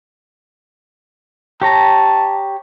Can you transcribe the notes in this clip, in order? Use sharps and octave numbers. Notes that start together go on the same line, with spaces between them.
G4 C#5 A5 A#5